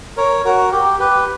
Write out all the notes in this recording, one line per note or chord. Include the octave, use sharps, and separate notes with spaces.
A#4 C#5
F#4 A#4
G4
G4 B4